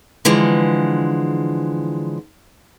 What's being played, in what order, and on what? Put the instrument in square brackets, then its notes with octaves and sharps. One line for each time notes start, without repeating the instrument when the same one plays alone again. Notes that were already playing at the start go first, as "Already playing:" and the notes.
[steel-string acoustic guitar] D3 E3 F3 G#3